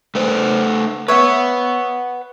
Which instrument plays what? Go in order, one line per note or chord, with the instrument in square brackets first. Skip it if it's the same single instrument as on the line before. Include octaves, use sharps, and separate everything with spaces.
[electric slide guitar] A3 B4 C5
[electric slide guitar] B4 F#5 [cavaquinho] C#5 E5